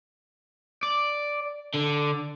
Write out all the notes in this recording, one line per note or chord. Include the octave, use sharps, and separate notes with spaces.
D5
D3